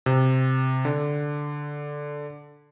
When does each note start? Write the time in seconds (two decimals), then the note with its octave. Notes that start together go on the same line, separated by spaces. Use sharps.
0.06 C3
0.85 D3